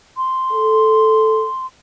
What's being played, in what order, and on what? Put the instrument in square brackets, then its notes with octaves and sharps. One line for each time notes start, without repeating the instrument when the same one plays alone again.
[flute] C6
[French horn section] A4